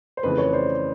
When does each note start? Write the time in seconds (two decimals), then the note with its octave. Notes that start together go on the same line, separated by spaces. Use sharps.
0.17 C5
0.23 F2 C#3 E3 A3 B4
0.38 B4 C#5
0.53 C5 D5